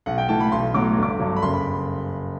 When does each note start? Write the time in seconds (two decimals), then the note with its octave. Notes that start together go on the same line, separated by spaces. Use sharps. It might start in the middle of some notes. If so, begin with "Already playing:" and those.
0.06 B1 F#5
0.18 G5
0.29 A2 E3 A3 A5
0.40 B5
0.52 B1 C6
0.74 A2 F#3 B3 D6
0.98 G1
1.03 D6
1.19 G2 F#3
1.36 B5
1.42 F#1 C6
1.53 B5